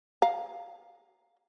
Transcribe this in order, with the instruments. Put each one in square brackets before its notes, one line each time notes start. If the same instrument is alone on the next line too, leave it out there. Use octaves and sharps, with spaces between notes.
[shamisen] F5 A#5